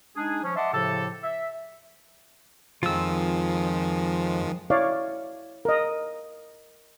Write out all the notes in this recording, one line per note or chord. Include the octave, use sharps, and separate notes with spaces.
G#3 D4 D#4 G#4
F3 C#4
D#5 E5 F#5 A5 C6 D6
A2 C#3 F3 G4 A4
E5
F2 D#3 F3 G#3 F4 E6
E4 C#5 D5 F5
A#4 D#5